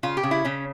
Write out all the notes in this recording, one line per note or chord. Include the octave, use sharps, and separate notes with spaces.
C#3 F4
G4
C#3
E4
C#3 C#4